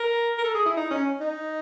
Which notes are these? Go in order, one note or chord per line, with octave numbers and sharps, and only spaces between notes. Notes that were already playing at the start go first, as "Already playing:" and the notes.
Already playing: A#4
A#4
A4
G#4
E4
D#4
C#4
D#4